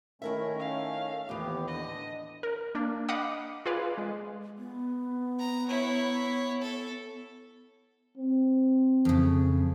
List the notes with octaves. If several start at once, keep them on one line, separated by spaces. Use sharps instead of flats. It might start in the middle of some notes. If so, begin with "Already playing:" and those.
D#3 A3 C#4 E4 A#4 E5
F5
D#2 A2 E3 B3 G4
D3 D#5
A#4
A#3 D4
D#5 F5 F#5 B5 D6 D#6
F4 G#4 B4 D5 F5
G#3
B3
A#5
E4 C#5
A4
C4
F2 C#3